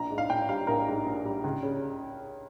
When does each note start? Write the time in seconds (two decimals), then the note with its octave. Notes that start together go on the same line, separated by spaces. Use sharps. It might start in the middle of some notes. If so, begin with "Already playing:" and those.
Already playing: A#1 A#5
0.10 G#2
0.18 F5
0.30 A#1 G5
0.49 G3 F5
0.67 A#1 A#4
0.87 G#2
1.06 A#1
1.24 G3
1.44 C#2
1.63 C#3